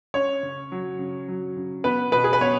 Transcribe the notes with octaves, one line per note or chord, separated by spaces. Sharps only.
C#4 C#5
C#3
F#3
C#3
F#3
C#3
B3 B4
B2 B4
G#4
B4
B3 C#5